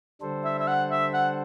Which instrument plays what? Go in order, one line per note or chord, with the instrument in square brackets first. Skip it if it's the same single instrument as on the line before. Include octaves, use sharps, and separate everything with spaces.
[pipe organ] D3 G3 D4 A4 C5
[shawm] E5
E5
F#5
E5
F#5